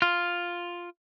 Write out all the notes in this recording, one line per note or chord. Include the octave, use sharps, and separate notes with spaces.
F4